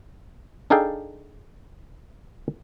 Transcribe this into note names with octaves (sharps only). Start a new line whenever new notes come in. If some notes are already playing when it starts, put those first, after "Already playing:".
D4 D#4 G#4 A4 F5 G5